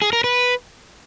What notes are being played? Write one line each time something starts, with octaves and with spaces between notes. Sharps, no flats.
G#4
A#4
B4